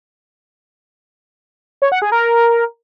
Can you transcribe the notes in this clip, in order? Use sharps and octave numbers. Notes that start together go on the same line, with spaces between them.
C#5
F#5
G#4
A#4